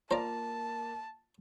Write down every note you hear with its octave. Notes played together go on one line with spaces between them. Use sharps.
A#3 F4 C5 D5 A5 A#5